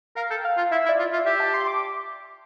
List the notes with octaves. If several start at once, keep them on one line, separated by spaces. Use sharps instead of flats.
A#4 F5
A4 G5
F5
F4
E4 E5
E4
D5
F4
E5
F4
G4 E5
A5
C6
D6